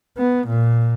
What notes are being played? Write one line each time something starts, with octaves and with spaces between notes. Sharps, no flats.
B3
A#2